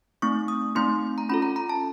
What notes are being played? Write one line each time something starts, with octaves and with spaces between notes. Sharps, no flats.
A3 C4 D#4 C#6
D#6
A3 C4 D#4 C6
A#5
C#4 F4 A4 B5
A#5
A#5
A5